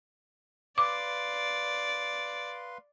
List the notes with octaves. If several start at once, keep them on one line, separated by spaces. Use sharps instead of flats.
B4 D5 F5 C6 D6